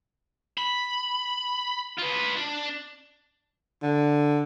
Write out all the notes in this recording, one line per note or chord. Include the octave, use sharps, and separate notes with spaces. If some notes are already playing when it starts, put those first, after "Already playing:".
B5
F4 B4
D4
D3